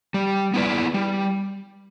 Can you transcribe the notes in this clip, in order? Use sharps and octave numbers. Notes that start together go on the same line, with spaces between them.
G3
B3 E4 B4 D5
G3